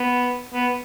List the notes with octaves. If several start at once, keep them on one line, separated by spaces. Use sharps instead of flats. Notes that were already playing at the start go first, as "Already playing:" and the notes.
Already playing: B3
B3